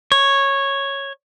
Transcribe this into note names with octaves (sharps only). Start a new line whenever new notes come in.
C#5